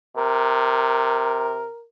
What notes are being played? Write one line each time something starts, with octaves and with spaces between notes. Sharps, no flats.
C3 A#4